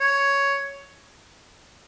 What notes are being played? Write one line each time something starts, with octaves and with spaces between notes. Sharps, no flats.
C#5